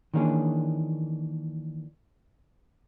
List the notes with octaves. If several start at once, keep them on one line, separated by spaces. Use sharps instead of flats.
D#3 E3 A#3 C#4 D4 G#4